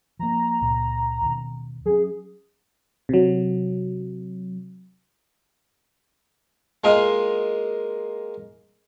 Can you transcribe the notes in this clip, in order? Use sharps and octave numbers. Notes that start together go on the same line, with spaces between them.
F3 A#3 A#5
C#2 A#2
D#2 B2
F#3 C#4 G#4
C3 F#3
G#3 A#3 F4 A#4 D#5 F5